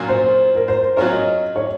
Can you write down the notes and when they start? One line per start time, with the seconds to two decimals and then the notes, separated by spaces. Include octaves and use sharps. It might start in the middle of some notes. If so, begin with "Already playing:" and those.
Already playing: A#2 F#3 C#4 F4
0.08 C5
0.56 A#4
0.68 C5
0.96 F#3 C#4 F4 A#4 C#5
1.12 D#5
1.56 C#5